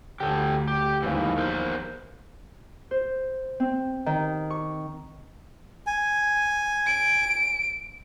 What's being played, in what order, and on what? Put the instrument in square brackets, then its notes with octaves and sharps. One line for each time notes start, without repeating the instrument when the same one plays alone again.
[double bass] D2 [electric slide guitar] G4 A4
[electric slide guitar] G4
[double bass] D#2 F3 [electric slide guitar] G#2 E3
[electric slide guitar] E2 A#4 C5
[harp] C5
C4
D#3
C#6
[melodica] G#5
[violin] D7